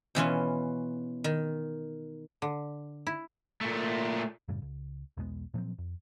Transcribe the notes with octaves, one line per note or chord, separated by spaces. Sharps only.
B2 E3 C#4 F4
D#3
D3
E4
A#2 A3
F#2 A2 C#3 G3
C#2
B1 E2 G#3 B3
A#2 F3 F#3 C4
F2